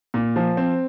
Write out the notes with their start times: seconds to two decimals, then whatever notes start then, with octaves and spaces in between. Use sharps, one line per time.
0.14 A#2
0.36 F3
0.57 C4